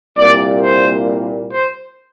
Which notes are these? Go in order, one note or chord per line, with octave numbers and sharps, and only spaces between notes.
C2 A#2 G3 A#3 D5
C5
C5